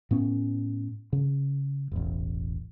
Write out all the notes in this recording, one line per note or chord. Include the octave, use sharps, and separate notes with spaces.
A2 B3 C#4
C#3
E1 A1